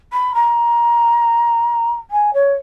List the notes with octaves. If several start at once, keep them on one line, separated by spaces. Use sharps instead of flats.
B5
A#5
G#5
C#5